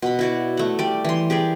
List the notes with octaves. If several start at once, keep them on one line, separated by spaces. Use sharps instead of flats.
B2 B5
E4 F#4 D5
A3 F#5
G3 D5
E3 C6
G4 G#4 A#4 D5